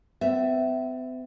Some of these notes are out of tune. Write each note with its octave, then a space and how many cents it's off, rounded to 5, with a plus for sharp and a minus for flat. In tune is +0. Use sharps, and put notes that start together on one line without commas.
C4 -45 F#4 +0 E5 +0